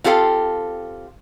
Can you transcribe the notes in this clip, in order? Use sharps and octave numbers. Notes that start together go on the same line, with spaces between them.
C4 F4 G4 A4 A#4 F5